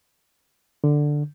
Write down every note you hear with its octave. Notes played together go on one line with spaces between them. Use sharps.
D3